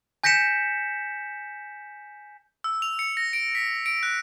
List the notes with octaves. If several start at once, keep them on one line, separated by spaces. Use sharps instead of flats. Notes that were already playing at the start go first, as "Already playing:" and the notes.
G#5 G6 A#6 B6 C#7 E7
E6
F7
C#7
A#6
D7
B6
D7
F#6